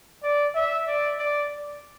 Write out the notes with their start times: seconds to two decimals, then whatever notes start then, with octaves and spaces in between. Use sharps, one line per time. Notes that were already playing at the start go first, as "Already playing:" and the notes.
0.23 D5
0.55 E5
0.87 D5
1.19 D5